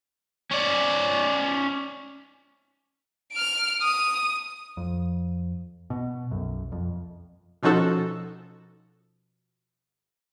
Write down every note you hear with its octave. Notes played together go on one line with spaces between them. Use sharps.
C#4 D5
F6 D7
D#6
F2
B2
B1 F#2
F2
B2 F3 C#4 D#4 F#4 A4